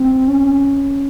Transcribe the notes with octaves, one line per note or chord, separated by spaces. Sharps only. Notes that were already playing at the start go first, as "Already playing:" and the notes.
Already playing: C4
C#4